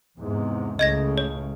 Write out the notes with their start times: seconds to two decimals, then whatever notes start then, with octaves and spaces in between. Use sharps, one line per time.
0.19 E2 G#2 C3
0.79 C#2 A2 C#3 D#5 G#6 A#6
1.18 C#5